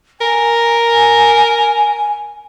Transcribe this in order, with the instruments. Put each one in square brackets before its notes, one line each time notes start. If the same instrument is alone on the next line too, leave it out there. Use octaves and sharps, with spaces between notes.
[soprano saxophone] A#4 [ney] G#5